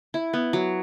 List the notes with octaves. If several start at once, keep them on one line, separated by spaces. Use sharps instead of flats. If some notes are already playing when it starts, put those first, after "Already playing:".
E4
B3
F#3